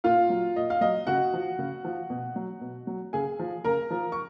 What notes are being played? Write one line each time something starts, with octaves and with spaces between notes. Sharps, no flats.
A#2 F4 F5
F#3
A#2 D#5
F5
F#3 D#5
C#3 F#4 F#5
F3
C#3
F3
B2
F#3
B2
F#3
C#3 G#4 G#5
F3
C#3 A#4 A#5
F3
C#6